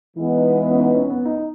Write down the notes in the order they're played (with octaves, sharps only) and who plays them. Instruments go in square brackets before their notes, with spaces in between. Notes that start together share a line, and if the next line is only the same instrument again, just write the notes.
[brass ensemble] E3 G#3 B3 [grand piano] E4
[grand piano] D#4
E4
C#4
D#4
C#4
B3
D#4